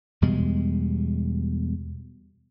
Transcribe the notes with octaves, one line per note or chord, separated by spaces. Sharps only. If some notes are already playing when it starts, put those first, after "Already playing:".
E2 B2 G3 G#3